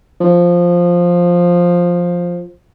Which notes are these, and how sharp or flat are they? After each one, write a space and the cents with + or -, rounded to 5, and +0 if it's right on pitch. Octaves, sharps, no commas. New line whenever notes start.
F3 +5